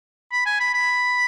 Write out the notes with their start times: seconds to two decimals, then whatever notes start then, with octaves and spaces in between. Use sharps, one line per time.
0.32 B5
0.46 G#5
0.60 B5
0.74 B5